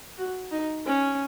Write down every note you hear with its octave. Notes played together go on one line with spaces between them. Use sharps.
F#4
D#4
C#4